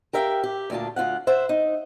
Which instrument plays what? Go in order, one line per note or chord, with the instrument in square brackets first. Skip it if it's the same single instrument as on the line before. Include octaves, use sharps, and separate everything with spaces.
[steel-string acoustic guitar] G4 A#4 E5 F5 G5
G4
D2 A#2 D4 F4 A5
D2 F4 F5 F#5
C5 E5 F#5
D#4